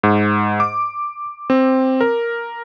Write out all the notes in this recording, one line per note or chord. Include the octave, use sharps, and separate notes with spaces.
G#2
D6
C4
A#4